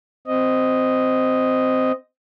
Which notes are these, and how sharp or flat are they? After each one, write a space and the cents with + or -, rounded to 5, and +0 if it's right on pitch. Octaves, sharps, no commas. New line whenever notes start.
C4 -10 D#5 +0